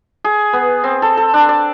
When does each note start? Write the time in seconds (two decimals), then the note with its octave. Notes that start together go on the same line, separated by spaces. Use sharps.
0.25 G#4
0.53 B3
0.84 C4
1.02 A4
1.17 A4
1.34 D4
1.49 D5